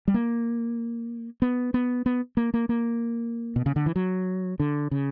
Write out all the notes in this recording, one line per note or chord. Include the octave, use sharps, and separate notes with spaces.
G3
A#3
B3
B3
B3
A#3
A#3
A#3
B2
C#3
D3
E3
F#3
D3
C#3